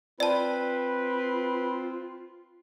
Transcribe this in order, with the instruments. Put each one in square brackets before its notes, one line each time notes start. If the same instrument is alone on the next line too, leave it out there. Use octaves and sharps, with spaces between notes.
[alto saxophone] C4 [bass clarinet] F4 [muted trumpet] B4 [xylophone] D5 A5